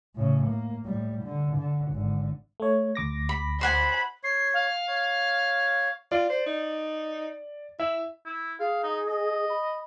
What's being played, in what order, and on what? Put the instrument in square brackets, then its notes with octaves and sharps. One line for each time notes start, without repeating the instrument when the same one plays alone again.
[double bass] A2 C#3
A#3
A2 G3
D3
D3
G#1 D3
[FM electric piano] A3 C#5
D2 D6 A#6
[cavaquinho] B5
[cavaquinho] C5 F#5 G#5 [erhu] B5
[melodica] C#5 [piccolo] C7
[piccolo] F5
[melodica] C#5
[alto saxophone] F4 [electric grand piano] D5
[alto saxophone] C5
D#4
[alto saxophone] E4 [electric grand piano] E5
[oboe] E4
[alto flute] G#4 [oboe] F5
[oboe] D#4
D#5
[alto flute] B5